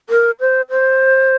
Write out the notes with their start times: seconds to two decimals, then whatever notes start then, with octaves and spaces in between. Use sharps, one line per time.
0.10 A#4
0.40 C5
0.70 C5